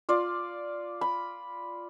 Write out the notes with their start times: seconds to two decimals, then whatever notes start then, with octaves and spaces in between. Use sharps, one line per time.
0.09 F4 D5
1.01 B5